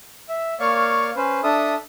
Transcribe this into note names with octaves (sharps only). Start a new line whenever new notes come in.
E5
A#3 C#5 D5 F5 C#6
C#4 B4 C5
D4 A4 E5 D#6